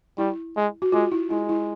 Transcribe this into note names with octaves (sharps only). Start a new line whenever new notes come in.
G3 E4
G#3
F#4
G#3 F4
E4
G#3 E4
E4